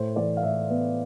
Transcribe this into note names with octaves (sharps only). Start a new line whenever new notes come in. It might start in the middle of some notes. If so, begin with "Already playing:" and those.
Already playing: A2 C5
E3 D5
F5
A2 E5
B3